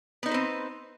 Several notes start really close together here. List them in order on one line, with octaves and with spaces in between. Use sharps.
B3 D#4 C5 B4 C4